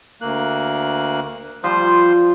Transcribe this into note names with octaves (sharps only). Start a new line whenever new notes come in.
D2 A#3 F#6
F3 G3 C5